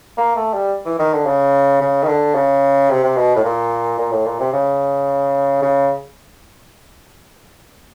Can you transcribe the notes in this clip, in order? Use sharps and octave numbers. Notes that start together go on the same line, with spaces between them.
A#3
A3
G3
E3
D#3
D3
C#3
C#3
D#3
D3
C#3
C3
C3
B2
A2
A#2
A#2
A2
A#2
C3
C#3
C#3